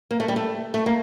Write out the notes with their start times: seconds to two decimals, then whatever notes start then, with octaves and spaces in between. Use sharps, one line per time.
0.11 A#3
0.20 A3
0.28 G3
0.36 A3
0.74 A3
0.86 A#3